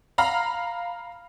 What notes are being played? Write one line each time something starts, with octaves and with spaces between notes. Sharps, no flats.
F5 A#5 B5